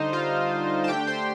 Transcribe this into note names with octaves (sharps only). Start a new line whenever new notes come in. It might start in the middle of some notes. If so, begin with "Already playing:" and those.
Already playing: D3 G3 D4 D#4 C5 D#5
F4 F5
A5
D3 A3 D4 G4 G5
C5 C6